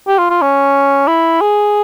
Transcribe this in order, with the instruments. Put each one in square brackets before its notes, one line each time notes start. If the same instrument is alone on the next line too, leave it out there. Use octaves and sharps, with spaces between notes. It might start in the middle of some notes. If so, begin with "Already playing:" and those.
[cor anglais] G4
F4
F4
C#4
E4
G#4